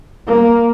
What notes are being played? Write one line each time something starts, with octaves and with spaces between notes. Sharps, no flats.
A#3